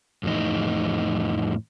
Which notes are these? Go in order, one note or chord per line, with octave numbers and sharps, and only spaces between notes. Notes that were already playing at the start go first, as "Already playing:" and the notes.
F2 A2 E3 D#4